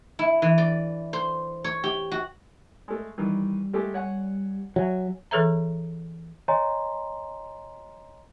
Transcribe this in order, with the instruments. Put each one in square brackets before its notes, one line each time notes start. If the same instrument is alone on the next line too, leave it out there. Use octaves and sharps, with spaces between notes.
[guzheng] E4
E3
D5
C5
C#5
G4
F#4
[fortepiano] G#3 A3
[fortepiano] D#3 E3 [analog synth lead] G3
[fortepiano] G#3 A3 G4
C#5 F#5 G#5
[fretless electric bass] F#3 [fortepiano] E5 G#5
[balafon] E3 G#4 A4 B4 E5 A#5
[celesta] C#5 D#5 G#5 A#5 C6